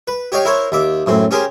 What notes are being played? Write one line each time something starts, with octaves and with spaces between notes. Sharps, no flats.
B4
G4 C#5 D#5 F5 G5
E4 A#4 C5 C#5
D#2 E5 D6
F#2 A2 C4
C#4 G4 G#4 A#4 C5